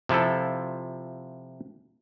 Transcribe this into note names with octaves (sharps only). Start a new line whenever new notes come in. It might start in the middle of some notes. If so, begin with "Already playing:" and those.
C3 F3 E4 F4 A4